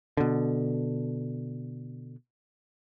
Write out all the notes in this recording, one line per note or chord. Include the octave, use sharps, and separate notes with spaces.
B2 D3